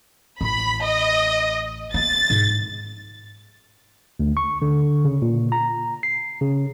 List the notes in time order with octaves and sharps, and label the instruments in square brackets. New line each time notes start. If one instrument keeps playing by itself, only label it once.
[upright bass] A1 [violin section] B5
[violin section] D#5
[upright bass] A#3 B3 [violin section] A6
[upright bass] G#2
[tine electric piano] D2
C#6
D3
C#3
A#2
A#5
C7
C#3